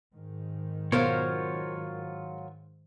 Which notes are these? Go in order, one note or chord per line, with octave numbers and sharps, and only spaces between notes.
G#2 D#3
B2 F#3 F4 A#4 C5 C#5 F5